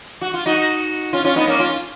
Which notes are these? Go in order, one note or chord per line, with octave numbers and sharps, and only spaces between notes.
F#4
F4
D#4 F#4
C#4 F4
C#4 F4
B3 D#4
A#3 C#4
C#4 F4